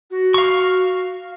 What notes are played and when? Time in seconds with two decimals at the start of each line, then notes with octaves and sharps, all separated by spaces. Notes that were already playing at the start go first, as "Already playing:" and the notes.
0.10 F#4
0.34 F5 C#6